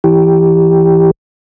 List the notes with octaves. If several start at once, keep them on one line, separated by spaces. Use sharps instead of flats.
E3 G4